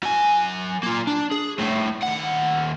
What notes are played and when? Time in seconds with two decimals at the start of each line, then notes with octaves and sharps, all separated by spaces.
0.03 F#3 G#5
0.83 A#3 F4
1.07 D4
1.32 G#4
1.59 C2 A2
2.03 D#2 F#5